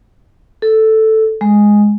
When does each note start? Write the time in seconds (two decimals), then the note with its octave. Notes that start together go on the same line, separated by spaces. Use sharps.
0.62 A4
1.41 G#3